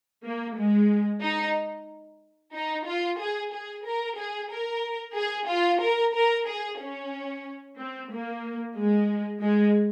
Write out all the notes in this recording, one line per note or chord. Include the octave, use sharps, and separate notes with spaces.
A#3
G#3
D#4
D#4
F4
G#4
G#4
A#4
G#4
A#4
G#4
F4
A#4
A#4
G#4
C#4
C4
A#3
G#3
G#3